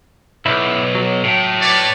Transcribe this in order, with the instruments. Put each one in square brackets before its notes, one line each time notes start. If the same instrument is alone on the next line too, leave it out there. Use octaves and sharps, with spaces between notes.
[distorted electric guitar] B1 [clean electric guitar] E4
[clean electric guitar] F#3
[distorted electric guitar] A2
[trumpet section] B4 C#5 D5